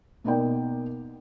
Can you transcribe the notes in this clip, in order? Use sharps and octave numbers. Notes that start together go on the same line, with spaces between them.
B2 A#3 D#4 A#4 D5 G5